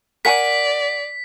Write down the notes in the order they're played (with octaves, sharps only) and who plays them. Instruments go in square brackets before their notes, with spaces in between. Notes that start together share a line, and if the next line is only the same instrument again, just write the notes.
[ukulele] A#4 F#5 G#5 [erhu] D5 [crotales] B6